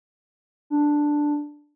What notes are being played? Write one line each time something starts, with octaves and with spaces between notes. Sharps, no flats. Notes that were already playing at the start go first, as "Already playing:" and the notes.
D4